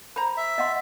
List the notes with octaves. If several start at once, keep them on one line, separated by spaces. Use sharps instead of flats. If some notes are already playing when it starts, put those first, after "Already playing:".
C5 A#5 B5
E5
D#5 F#5 C6